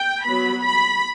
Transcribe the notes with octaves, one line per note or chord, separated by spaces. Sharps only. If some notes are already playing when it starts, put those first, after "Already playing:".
Already playing: G5
F#3 B3 B5
B5